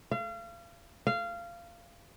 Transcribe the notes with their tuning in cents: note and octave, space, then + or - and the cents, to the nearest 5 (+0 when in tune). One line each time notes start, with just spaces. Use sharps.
F5 -35
F5 -20